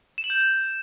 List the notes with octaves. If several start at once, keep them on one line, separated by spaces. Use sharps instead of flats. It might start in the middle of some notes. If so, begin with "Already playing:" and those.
E7
F#7
G6